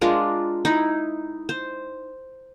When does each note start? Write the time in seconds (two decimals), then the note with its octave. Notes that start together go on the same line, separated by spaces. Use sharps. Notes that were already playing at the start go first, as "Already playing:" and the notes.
0.01 G#3 D4 F4 A#4
0.65 D#4 E4
1.49 C5